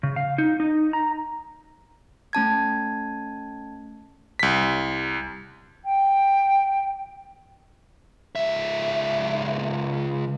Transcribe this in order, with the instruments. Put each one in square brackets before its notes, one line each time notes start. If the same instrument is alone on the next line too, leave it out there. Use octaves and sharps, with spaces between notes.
[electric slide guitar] C#3
F5
D#4
D#4
A#5
[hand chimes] A3 C#4 A5 G#6
[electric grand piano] C2 B6
[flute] G5
[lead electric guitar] C#2 E5